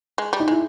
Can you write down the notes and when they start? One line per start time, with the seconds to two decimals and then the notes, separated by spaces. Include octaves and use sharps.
0.18 G#3
0.33 G3
0.40 D#4
0.48 G#3 E4